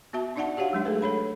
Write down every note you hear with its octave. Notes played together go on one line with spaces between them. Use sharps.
B3 F#4 E5 A5
D4 D#4 D5 E5 F#5 A5
F#4 G4 C#5 F5 F#5
F#3 G#3 D4
A3 G#4 A4 B4
A4 C#5 B5